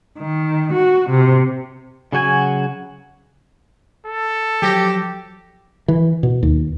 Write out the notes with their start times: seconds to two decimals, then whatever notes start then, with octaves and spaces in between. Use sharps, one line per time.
0.20 D#3
0.74 F#4
1.10 C3
2.12 C#3 F#3 F#4 G#5
4.07 A4
4.62 F3 F#3 G4 A#6
5.88 E3
6.23 B2
6.43 D#2